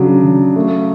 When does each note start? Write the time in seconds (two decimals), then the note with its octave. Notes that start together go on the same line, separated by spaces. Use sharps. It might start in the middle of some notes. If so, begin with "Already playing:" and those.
Already playing: C#3 F#3 D4
0.23 C#3
0.56 A3